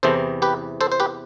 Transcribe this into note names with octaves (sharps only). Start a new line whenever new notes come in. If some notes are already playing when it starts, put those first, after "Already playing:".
E2 C3 E3 A4 C5
G4 B4
A4 C5
C5
G4 B4